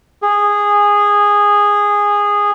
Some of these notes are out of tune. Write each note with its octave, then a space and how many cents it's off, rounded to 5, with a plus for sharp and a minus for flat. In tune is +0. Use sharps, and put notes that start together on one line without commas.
G#4 -15